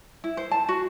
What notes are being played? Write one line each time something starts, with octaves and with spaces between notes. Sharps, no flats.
E4
C5
A5
F#4